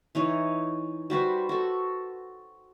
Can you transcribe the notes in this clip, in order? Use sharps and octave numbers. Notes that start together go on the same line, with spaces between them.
E3 D#4 C#5
G3 F#4 B4 C5
F#4 A4